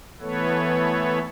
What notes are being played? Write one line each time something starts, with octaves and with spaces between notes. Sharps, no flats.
E3 A3 B3 A4 B4 C#5